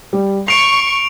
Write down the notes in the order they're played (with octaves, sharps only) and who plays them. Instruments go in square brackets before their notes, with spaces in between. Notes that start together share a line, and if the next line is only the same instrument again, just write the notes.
[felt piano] G3
[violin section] C#6 [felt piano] C7 [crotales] D7 F7